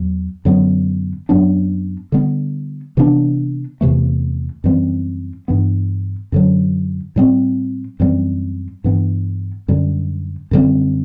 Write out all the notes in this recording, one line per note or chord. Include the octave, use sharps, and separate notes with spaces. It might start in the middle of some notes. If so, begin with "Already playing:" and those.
Already playing: E2 F#3
F#2 D3 F#3 B3
F#2 F#3 B3 D4
D3 G3 B3
C3 E3 B3 D4
E2 C3 E3 A3
F#2 E3 G3 C4
G2 E3 B3
F#2 D3 F#3
A2 G3 C4
F#2 E3 G3 C4
G2 E3 B3
F#2 D3 G3
F#2 D3 G3 C4